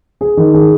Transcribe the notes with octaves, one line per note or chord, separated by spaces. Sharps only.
G#4
D#3
G#4